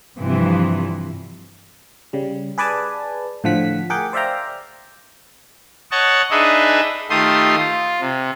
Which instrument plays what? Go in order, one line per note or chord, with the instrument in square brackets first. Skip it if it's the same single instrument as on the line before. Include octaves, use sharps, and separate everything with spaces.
[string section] G2 C3 E3 F3
[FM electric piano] C#3 G3
G#4 B4 D5 G#5 A5
A2 D3 F3 F#5 B6
G#4 A#4 F#5 G5 D6
C5 D5 E5 F5 G5 A#5
[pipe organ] C#5 D#5 F#5 A5 C#6
D4 D#4 G#4 B4 D#5 E5
D#3 A3 F4 G4 C6 D#6
F4
C3